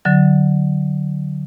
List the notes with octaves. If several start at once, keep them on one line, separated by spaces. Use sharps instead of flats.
D3 F#3 A6